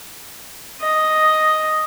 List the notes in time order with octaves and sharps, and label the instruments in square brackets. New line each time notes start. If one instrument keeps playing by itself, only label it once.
[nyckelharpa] D#5